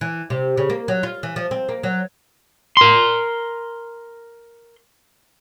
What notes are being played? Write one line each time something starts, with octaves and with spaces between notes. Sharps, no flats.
E3
C3
C#3
A#3
F#3
F4
E3
F3
C4
A#3
F#3
A#4 C6